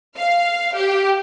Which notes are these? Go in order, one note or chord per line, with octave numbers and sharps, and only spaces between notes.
F5
G4